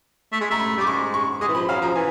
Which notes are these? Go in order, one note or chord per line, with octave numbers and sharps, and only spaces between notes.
A3
G#3
A3 A#5
B5
G3 D6
G#3 C#6
C#6
G#3 D#6
E3
F3 B5
F#3 F5
F3 A#5
E3 G#5